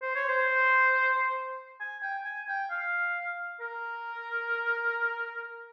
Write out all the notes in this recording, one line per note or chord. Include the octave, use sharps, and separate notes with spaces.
C5
C#5
C5
G#5
G5
G#5
G5
F5
A#4